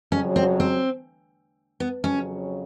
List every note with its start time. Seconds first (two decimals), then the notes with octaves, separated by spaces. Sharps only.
0.12 F2 C#3 F#3 C#4
0.36 C4
0.60 C4
1.80 B3
2.04 F2 C#3 F#3 C#4